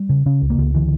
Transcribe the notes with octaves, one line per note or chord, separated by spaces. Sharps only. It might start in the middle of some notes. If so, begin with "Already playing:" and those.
Already playing: G3
C#3
C#3 C#4
C#2
A#3
C#2
D3 E3